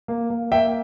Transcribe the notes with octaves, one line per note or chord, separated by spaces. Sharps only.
A#3
A#3
A#3 E5 G5